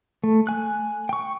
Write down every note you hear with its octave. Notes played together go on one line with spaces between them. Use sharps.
A3
G#5 F#6
G5 C#6